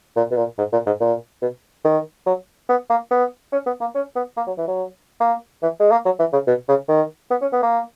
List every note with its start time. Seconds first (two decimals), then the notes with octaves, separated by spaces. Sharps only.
0.16 A#2
0.31 B2
0.37 A#2
0.58 G#2
0.72 A#2
0.86 G#2
1.00 A#2
1.42 B2
1.85 D#3
2.26 F#3
2.69 B3
2.89 A#3
3.11 B3
3.52 C#4
3.66 B3
3.81 A#3
3.95 C#4
4.15 B3
4.37 A#3
4.47 F#3
4.58 E3
4.67 F#3
5.20 A#3
5.62 E3
5.80 G#3
5.91 A#3
6.05 F#3
6.19 E3
6.33 C#3
6.47 B2
6.68 C#3
6.89 D#3
7.30 B3
7.41 C#4
7.53 B3
7.63 A#3